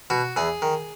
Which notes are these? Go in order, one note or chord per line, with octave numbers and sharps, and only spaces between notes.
B2 F#4
E2 G#4
D#3